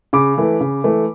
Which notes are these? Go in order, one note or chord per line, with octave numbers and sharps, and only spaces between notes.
C#3 B5 D6
E3 A3
C#3
E3 A3